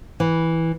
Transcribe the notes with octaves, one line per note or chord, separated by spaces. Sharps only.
E3